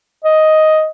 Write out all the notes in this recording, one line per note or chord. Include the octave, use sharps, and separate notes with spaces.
D#5